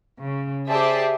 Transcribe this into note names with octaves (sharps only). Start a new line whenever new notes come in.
C#3
G4 G#4 C5 D5 E5 A5